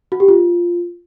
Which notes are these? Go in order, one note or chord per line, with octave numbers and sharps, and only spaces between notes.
F#4
G4
F4